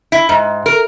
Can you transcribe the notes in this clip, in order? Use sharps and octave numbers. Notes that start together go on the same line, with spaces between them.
E4
G#2
A#4